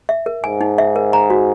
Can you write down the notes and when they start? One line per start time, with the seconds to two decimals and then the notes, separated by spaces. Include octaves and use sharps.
0.09 E5
0.26 A#4
0.44 G#2 G#5
0.61 D#4
0.78 E5
0.96 A#4
1.13 A#5
1.30 F#4